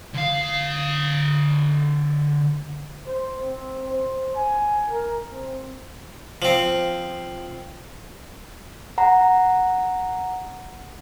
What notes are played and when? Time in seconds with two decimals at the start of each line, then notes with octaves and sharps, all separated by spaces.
0.14 D3 F5
3.06 C5
3.42 C4
3.89 C5
4.35 G#5
4.89 A#4
5.32 C4
6.42 F3 C4
8.98 F#5 A#5